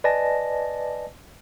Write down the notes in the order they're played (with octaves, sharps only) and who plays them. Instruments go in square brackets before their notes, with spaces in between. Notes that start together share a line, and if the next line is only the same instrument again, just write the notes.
[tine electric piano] B4 D5 D#5 G#5 A5 A#6